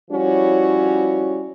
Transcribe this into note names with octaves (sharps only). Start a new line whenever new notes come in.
F3 G3 C#4 E4 F#4 C#5